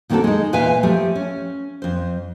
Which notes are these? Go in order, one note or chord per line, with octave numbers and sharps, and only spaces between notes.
A#2 D#3 A#3 C4 F#4 A4
G#3 D#4
E2 A#2 B4 E5 F5 G#5
F3 A3 G4
C#4
F2 C5